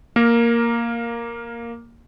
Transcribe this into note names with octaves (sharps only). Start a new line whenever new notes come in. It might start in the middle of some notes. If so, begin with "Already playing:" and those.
A#3 A#4